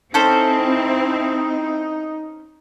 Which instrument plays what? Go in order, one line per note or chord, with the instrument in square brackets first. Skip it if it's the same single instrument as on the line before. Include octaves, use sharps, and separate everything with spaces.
[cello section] C4 E4 [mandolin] C#4 A4 C5 [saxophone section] D#4